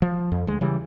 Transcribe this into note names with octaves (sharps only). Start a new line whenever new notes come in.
F3
F2
D2 G#3
C#3 E3 G3